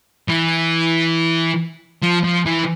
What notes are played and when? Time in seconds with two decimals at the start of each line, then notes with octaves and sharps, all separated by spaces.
0.28 E3
2.02 F3
2.24 F3
2.46 E3